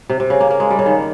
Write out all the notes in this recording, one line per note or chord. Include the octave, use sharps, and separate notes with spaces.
C3
C3
C#3
A#3
A#3
G#3
G3
C#3
D#3